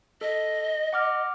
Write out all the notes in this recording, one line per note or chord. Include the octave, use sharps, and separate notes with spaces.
A4 D#5
F#5 D6 F6